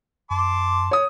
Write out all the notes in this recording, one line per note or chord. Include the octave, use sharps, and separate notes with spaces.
F#2 A5 C6 D6
C#5 D#6